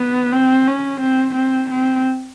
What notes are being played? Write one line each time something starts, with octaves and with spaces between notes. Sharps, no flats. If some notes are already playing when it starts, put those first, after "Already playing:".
Already playing: B3
C4
C#4
C4
C4
C4